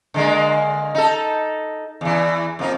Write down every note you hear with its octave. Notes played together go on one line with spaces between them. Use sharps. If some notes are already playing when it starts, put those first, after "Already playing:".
D3 G#3 A#3
D#4 A4
E2 E3
F2 A#3 D#4